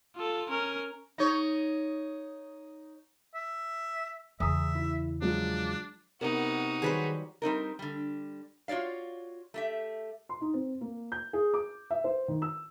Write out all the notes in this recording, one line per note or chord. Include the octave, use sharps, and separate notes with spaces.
F4 A4
C#4 A#4
D#4 C#5
E5
E2 C#3 E5 G#5 A#5 D#6
E4
F3 F#3 G#3 D4
C3 B3 D#4 F#4 A#4
D#3 F#3 G3 G#4 B4 C5
G3 C4 D#4 A#4
D3 G3
F4 F#4 C#5 D5 F5
A3 G4 E5
C6
D#4
C4
A#3
G6
G#4
D6
E5
C5
D#3
E6